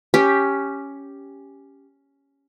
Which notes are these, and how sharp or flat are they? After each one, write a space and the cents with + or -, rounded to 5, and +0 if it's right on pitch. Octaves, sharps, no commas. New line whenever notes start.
C#4 +5 G4 +0